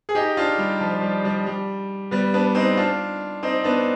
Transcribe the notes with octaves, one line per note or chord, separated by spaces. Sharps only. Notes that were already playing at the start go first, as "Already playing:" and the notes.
G#4
D#4 G4
D4 F4
G3
F3
G3
G3
G3
G3 B3
B3 D4
C4 D#4
D4 F4
C4 D#4
B3 D4